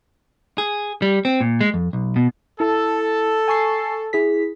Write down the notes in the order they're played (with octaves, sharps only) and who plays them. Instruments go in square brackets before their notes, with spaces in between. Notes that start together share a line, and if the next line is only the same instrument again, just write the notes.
[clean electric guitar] G#4
G3
C4
A#2
G#3
F2
B1
B2
[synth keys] E4 [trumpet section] A4
[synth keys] G#5 C#6 C7
E4 G#4 B6